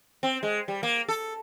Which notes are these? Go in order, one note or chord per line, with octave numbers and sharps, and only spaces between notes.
C4
G#3
G3
A#3
A4